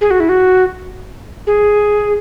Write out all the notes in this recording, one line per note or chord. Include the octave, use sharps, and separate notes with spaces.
G#4
F#4
E4
F#4
G#4